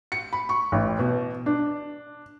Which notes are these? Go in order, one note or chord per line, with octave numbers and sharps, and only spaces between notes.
C#7
B5
C#6
A1
B2
D4